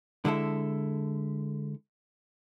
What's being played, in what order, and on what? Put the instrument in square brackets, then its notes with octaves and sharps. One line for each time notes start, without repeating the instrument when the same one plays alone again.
[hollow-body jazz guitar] D3 G#3 E4 A4